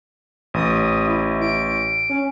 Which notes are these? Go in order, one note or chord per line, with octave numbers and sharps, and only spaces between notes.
A1 D#6
E4
D7
C#4